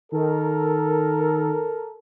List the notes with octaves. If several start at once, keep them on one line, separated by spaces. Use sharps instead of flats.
D#3 A4 A#4